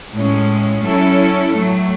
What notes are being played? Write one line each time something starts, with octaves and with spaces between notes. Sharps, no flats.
A2 G#3 C#4
F#3 C#4 E4 A4
A2 F#3 A3